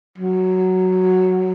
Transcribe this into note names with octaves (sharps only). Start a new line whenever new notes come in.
F#3